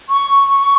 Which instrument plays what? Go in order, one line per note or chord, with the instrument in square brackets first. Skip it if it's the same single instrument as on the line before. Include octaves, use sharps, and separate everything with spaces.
[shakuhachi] C#6